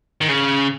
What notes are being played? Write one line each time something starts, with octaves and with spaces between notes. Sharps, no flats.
D#3
C#3